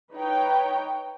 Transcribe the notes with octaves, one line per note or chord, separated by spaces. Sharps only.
D#4 B4 C#5 G5